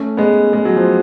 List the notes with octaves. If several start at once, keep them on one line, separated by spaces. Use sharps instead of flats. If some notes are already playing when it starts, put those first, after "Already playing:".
Already playing: A3 C#4
G#3 B3
G#3
F#3
F3